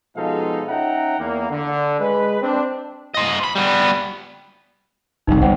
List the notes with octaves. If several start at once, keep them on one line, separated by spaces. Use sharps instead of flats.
B2 F3 G#3 D#4 A4 F5
C#4 D#4 E5 F#5 G5 A#5
E2 A#3
D3
G#3 B4
C4 D4
C5 D#5
B5
G3 B3
F#1 C2 D#4
G1 C5 F#5 G5